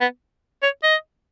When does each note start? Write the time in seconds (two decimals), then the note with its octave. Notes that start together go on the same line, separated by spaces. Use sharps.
0.01 B3
0.63 C#5
0.83 D#5